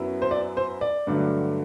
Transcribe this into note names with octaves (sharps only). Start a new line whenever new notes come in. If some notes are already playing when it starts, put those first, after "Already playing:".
Already playing: F#2 F#3 B3 E4
C5
D5
C5
D5
G2 D3 F#3 A3